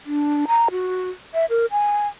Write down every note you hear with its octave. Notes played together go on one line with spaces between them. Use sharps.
D4
A#5
F#4
E5
A#4
G#5